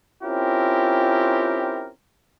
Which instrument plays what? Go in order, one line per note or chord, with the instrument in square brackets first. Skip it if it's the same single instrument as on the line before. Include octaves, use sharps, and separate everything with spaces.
[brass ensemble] C4 C#4 E4 F4 G4 A#4